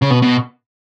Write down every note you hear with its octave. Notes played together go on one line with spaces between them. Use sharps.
C#3
B2
B2